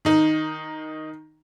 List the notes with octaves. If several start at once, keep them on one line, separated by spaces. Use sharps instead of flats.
D#3 D#4